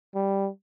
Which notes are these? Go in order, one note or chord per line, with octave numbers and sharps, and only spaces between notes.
G3